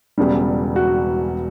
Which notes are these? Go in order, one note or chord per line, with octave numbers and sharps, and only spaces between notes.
E1 E2 C#3 G3
F#4